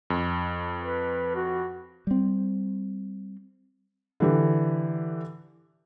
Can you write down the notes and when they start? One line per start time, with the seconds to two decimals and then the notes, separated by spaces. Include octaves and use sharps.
0.10 F2
0.80 B4
1.35 F#4
2.07 G3 C4
4.20 D3 E3 G4